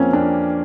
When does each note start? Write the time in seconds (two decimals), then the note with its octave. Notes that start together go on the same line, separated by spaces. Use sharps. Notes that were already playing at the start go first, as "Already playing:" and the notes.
Already playing: F2 F3 A#3 C4 C#4
0.13 F2 D4